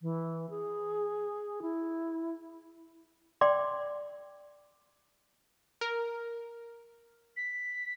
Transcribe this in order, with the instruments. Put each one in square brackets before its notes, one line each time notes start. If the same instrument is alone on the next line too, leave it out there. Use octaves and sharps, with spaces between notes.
[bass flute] E3
G#4
E4
[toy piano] D5 G5 C6 D6
[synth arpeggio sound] A#4
[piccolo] B6